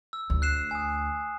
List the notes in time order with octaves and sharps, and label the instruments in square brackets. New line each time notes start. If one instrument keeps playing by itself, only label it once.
[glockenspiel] E6
[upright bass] D2
[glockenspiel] F#6 C7 E7
G#5 D#6